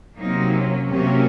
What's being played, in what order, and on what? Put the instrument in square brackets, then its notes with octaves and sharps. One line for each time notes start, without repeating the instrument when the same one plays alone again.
[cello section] C3 F#3 A#3 D#4
C#4
C3 F#3 A#3 C#4